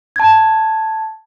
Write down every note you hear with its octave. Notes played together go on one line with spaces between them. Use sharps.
A5 G#6